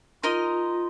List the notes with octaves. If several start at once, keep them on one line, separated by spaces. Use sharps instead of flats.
D#4 F4 A#4 D#5